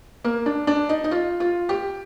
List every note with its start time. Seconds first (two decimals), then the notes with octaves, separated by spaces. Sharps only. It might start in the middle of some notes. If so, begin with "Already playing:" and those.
0.24 A#3
0.46 D4
0.67 D4
0.89 D#4
1.04 D#4
1.11 F4
1.40 F4
1.69 G4